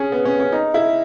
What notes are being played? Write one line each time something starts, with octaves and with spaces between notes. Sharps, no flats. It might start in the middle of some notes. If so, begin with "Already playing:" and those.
Already playing: C#4 G#4
B3
C#4
C#4
D#4
E4